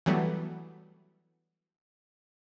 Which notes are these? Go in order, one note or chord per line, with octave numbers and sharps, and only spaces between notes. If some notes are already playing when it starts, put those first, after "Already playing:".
E3 F#3 G3 A3 B3